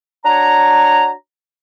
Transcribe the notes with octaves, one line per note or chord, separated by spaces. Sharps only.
D4 F#4 C#5 A#5